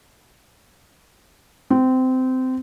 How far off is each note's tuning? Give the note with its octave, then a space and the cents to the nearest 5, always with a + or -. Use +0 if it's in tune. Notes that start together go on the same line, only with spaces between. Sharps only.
C4 -20